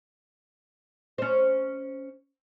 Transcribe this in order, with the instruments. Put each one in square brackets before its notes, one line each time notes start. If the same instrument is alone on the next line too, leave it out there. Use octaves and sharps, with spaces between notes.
[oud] C#4 C5